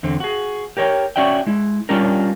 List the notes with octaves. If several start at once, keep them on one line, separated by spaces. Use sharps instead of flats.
E2 D3 C4
F#4 G#4
G4 A#4 C#5 G5
C#4 F#4 D5 E5 G5
G#3 E4
G3 C#4 D4 F4 G4 A#4